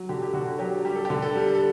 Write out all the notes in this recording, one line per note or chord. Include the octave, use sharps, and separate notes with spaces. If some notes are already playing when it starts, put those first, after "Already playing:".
Already playing: F#3
D3 G4
G4
D3 F#4
F#3 G4
G3 G4
A4
D3 G4
A4
G3
A4